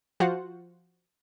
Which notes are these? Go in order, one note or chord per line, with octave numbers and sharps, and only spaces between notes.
F3 F4 F#4 C5 F#5